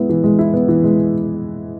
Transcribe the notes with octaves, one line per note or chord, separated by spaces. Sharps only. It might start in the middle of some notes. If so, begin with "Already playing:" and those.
Already playing: G#3 B3 E4
E3
G#3
E4
B3
E3
G#3